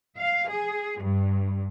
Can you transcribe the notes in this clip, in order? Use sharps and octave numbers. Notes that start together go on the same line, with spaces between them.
F5
G#4
G2